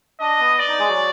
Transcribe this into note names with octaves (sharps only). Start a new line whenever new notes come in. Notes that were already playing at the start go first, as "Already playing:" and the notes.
D4 D#5
B3
D5
D#4
G#3 G#4
F#3 F#4